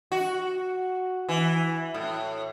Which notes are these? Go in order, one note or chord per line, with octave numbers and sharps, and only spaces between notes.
F#4
E3
A2